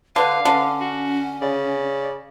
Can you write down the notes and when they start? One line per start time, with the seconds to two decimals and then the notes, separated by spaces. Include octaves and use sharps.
0.16 D3 B4 F5
0.45 D3 C#4
0.81 F#4
1.42 C#3 D5